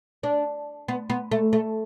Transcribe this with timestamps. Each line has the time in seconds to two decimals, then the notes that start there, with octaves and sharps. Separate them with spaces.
0.23 D4
0.88 B3
1.10 B3
1.31 A3
1.53 A3